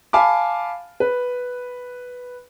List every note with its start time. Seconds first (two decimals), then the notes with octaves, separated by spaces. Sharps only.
0.13 F5 G#5 A5 B5 D6
1.00 B4